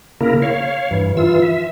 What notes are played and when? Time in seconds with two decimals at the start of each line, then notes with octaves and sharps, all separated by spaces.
0.21 C#3 A#3 E4 A#4
0.42 C#5 F5
0.91 G2 E3
1.17 E3 F4 E6
1.42 E5